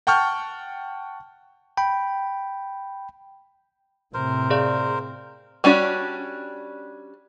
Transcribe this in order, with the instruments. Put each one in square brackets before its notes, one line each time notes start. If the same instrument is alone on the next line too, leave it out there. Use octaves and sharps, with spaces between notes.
[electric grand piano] F#5 G5 A5 C#6 F6 G6
[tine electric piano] G5 B5
[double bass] A2 C3 [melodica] A#4 C5
[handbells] G#4 D5 F5
[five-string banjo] G3 C#4 D4 F#4